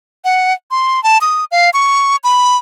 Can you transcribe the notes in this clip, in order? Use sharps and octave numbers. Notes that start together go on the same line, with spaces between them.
F#5
C6
A5
D#6
F5
C#6
B5